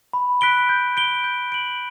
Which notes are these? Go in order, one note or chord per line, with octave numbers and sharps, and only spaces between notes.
B5
F#6 B6 D7 G7
G6
D7 G7
G6
D7 F#7